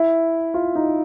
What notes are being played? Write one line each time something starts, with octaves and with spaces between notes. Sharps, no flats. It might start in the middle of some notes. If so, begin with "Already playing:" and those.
Already playing: E4
F4
D#4